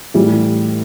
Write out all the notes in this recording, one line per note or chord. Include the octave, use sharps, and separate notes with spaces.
A2 E3 G3 E4 G4